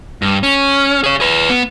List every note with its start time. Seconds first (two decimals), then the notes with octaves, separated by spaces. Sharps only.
0.22 G2
0.43 C#4
1.04 G#4 C#5
1.20 G#4 B4
1.50 B3